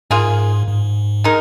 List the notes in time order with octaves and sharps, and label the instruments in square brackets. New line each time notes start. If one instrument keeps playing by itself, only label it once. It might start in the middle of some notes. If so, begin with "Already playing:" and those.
[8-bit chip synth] G#2 [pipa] A#3 F4 G#4
[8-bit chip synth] G#2
[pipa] G#3 D#4 A#4